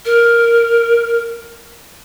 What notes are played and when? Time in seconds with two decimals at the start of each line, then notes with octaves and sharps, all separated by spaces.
0.05 A#4